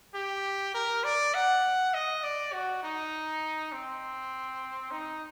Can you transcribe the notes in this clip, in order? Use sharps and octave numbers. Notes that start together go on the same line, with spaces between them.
G4
A#4
D5
F#5
D#5
D5
F#4
D#4
C4
D#4